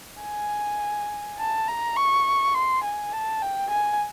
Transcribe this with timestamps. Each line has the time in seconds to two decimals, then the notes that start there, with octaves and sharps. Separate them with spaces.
0.22 G#5
1.38 A5
1.68 A#5
1.96 C#6
2.55 C6
2.84 G#5
3.13 A5
3.42 G5
3.70 G#5